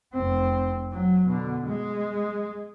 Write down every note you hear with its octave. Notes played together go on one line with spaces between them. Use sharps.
F1 C4
F#3
B2 D3
G#3